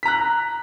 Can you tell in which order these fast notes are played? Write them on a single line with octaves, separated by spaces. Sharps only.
B6 A#5 F#6